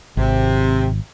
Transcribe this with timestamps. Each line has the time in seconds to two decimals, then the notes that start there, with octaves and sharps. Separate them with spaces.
0.17 G#1 C3